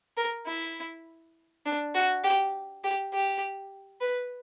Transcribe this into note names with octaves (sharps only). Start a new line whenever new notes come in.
A#4
E4
D4
F#4
G4
G4
G4
B4